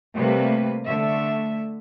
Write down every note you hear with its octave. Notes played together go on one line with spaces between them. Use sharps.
C3 G3 A3 A#3 B4
D3 A3 E5